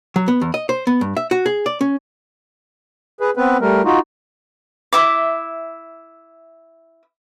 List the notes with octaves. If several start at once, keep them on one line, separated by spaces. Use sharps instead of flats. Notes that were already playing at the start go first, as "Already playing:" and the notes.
F#3
B3
E2
D#5
C5
B3
G2
E5
F#4
G#4
D5
C#4
G#4 B4
B3 C4 B4
G3 A3 A#4
D#4 F4 F#4
E4 E5 D6